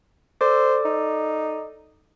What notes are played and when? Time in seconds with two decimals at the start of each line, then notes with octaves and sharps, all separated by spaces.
0.41 A4 C5 D5 D6
0.85 D#4